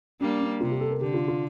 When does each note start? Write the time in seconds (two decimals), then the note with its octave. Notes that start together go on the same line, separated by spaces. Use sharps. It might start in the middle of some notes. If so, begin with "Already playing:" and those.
0.21 G3 A#3 D4
0.41 D4
0.61 C3 F4
0.71 G4
0.81 A4
0.91 A#4
1.01 D3 G4
1.14 F4
1.28 F4